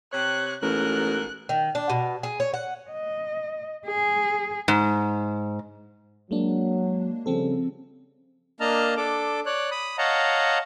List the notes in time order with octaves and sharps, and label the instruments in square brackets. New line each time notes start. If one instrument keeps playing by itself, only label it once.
[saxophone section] C3 C#5 [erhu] F#6
[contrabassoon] A1 [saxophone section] G#2 B2 A#4 [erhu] F#6
[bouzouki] D#3
D4
B2
G#4
C#5
F#5
[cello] D#5
G#4
[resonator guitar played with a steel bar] G#2
[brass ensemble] F#3 [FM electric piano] G#3 A#3 D4
[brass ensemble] C#3 G3 [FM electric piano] F3 C4 A4
[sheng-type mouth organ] A#3 D4 D#5 A5 A#5 F6
D4 A4 D6
C#5 D5 F#6
B5 D#6
C#5 D#5 F5 F#5 A5 A#5